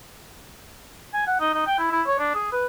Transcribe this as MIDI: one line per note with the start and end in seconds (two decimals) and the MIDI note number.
1.14 1.27 80
1.27 1.39 78
1.40 1.50 63
1.54 1.63 63
1.66 1.78 79
1.79 1.91 64
1.92 2.02 64
2.07 2.17 73
2.19 2.30 62
2.35 2.48 68
2.52 2.66 71